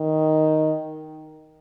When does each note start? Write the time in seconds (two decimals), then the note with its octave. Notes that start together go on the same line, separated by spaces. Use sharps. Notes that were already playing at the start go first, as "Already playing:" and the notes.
Already playing: D#3